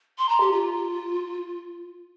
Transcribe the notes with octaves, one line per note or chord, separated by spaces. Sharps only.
C6
A#5
G4
F4